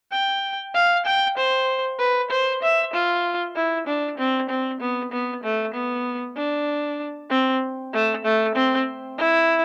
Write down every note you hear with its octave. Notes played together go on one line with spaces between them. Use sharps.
G5
F5
G5
C5
B4
C5
E5
F4
E4
D4
C4
C4
B3
B3
A3
B3
D4
C4
A3
A3
C4
E4